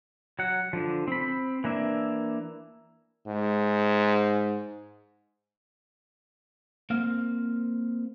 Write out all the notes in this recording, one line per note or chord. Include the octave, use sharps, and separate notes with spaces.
F#3 F#5
D3 F3
C4 B5
E3 A#3 D4 E5
G#2
A#3 C4 F5